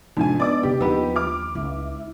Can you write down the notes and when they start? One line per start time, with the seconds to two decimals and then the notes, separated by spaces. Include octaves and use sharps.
0.17 F2 A2 C3 F3 G#3 D4 D#4 G#5
0.40 B3 D4 D5 D#5 D6 E6
0.63 C3 G4
0.80 D#2 F3 B3 D#4 G4 G5 B5 E6
1.16 D6 F6
1.55 C#2 E4